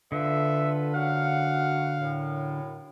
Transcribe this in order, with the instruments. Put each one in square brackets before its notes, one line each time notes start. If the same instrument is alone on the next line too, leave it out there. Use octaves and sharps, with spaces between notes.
[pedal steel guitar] D3 [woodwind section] F4 A4 B4 [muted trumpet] E5
[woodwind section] F#2 F#4 F#5 [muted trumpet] F5
[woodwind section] F#2 A2